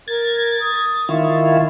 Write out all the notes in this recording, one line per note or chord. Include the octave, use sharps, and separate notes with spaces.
A#4 G#6 A6
D#6
D#3 E4 F4 C#6